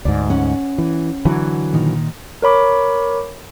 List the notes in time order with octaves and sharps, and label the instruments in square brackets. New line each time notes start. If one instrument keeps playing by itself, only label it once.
[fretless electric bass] D2 G#2 [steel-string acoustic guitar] D5
[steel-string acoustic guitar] C#4 F#5
[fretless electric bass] E3
D3 E3 F#3
[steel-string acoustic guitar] A#2 D#3 D#4
[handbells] A#4 C#5 B5 D6